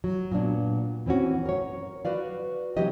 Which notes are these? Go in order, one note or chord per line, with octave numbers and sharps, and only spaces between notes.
F#3
A#2 B3 D4
E3 C4 C#4 F#4
A#4 C#5
F#4 B4 D5 F5
C3 E3 F#3 G4 D#5